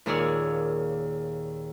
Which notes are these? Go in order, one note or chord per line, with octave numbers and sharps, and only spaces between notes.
D#2 A#2 G#4 C#5 D5 E6